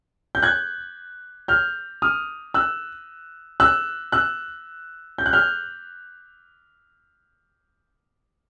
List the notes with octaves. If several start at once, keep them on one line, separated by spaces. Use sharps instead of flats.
G6
F#6 G#6
F6 G6
D#6 F6
E6 F#6
E6 F#6
E6 F#6
G6
F#6
F6 G6